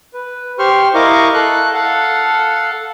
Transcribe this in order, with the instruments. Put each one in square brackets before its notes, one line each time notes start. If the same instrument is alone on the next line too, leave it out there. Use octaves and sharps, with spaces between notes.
[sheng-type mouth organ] B4
G4 C5 C6 C#6 F6
E4 A#4 D#5 F5 C#6 D6
A4 F#6
A4 F5 F#5